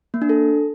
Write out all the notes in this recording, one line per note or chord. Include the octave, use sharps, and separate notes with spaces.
A#3
D4
A4